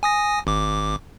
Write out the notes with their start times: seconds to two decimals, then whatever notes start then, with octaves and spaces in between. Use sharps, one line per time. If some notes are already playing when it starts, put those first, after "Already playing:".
0.03 G#5 D#6 A#6
0.47 G#1 D6